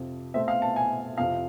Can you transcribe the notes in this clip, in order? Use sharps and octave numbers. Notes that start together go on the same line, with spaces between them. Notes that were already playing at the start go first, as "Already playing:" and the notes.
Already playing: F2 C3 F3
B2 A3 C4 E5
F5
A5
G#5
F2 C3 F3 F5